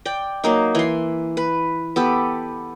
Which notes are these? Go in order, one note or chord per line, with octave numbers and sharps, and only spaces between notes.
D5 G5
F#3 A#3 D#4
E3 C6
B4
B3 G4 A4